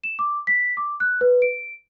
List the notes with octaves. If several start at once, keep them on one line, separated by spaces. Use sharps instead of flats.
E7
D6
B6
D6
F#6
B4
D7